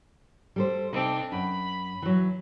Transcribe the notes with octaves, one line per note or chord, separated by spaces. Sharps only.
G3 A4 C5
C3 C4 D4 D#4
F#2 B5
E3 F#3